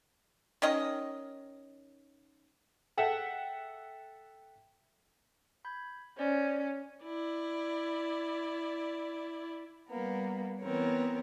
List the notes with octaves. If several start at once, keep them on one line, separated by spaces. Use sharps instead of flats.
D#3 C#4 D#5
A4 E5 F#5 G5
B5 G6 G#6
C#4 C5 D5 D#5
E4 D5
G3 A#3 B3
E3 B3 C4 A#4 C#5